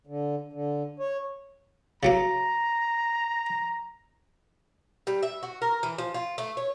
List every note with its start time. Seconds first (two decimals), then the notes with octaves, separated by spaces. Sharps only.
0.07 D3
0.52 D3
0.99 C#5
2.03 C#3 F#3 A#3 A#5
5.07 G3
5.23 E5
5.43 F#4
5.62 A#4
5.83 E3
5.98 F3
6.14 F4
6.38 A3
6.57 C#5